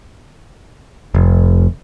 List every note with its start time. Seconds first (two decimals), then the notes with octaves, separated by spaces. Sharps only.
1.15 F1